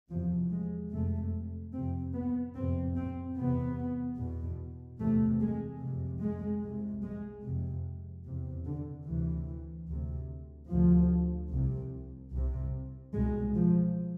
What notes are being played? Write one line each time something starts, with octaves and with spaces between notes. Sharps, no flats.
E2 C3 F3
G#3
F2 C3 A3
F2 C3 C4
B3
F2 C3 C4
C4
E2 C3 B3
E2 B2
E2 C3 A3
G#3
F2 C3
G#3
C2 C3
G#3
F2 C3
E2 C3
D3
D2 C3 E3
D2 C3
D2 C3 F3
C2 C3
C2 C3
C2 B2 G#3
F3